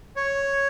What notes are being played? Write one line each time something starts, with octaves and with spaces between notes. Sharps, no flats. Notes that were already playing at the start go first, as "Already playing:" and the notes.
C#5